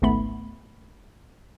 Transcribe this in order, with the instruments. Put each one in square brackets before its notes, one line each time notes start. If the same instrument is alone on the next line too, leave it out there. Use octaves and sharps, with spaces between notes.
[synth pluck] G#1 C#2 G#2 A3 B3 B5